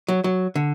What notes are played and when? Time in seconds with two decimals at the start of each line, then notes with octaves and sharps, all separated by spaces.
0.08 F#3
0.24 F#3
0.55 D3